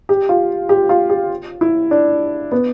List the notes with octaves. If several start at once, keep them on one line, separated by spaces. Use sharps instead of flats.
G4
F4
G4
F4
G4
E4
D4
B3